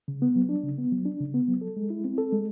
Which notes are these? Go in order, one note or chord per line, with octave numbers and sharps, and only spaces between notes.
C#3
B3
F#3
D4
C#3
B3
F#3
D4
C#3
B3
F#3
A4
G#3
E4
C4
A4
G#3